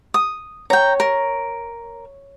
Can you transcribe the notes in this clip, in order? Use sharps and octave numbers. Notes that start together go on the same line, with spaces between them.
D#6
C#5 G5 A#5
A#4